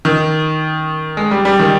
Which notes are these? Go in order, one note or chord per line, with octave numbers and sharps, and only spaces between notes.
D#3
G#3
G3
G3
D#3